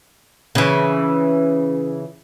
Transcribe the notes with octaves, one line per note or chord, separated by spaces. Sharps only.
C#3 E3